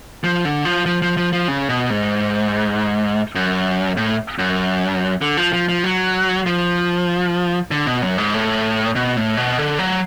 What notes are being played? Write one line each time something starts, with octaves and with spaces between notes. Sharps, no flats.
F3
D3
F3
F3
F3
F3
F3
C#3
B2
G#2
F#2
A2
F#2
D3
F3
F3
F3
F#3
F3
D3
B2
F#2
G#2
A2
B2
A2
B2
D3
F#3